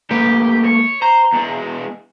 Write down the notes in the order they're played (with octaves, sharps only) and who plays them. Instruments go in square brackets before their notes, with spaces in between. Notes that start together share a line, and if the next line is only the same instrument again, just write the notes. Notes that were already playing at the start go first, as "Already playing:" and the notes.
[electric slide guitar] A3 A#3 B4 [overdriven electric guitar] G4
[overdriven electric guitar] C#5
[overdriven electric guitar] C5 [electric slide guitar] A#5
[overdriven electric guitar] E2 G#3